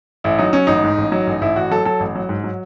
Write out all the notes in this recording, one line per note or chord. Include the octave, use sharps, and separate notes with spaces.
A1 E4
F#3 D#4
F#3 C#4
A1 D#4
G#2
A1
F#3
A1
A1 E4
A1 F#4
F#3 A4
F#3 A4
A1
F#3
G#2
F#3